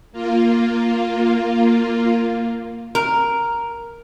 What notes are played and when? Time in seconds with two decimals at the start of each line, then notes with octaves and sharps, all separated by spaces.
0.12 A#3 F4
2.95 A#4